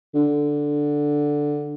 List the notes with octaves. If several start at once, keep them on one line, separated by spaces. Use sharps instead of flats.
D3